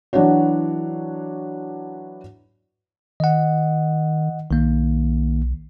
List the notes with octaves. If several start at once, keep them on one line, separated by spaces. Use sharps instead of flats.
E3 F#3 D4 E4 F#4 C#5
D#3 D#5 F#5
B1 D#3 A#3